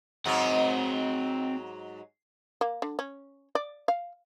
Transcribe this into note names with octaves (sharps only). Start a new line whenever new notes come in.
G#2 F#3 C4 F#5
A#3
D3
C#4
D5
F5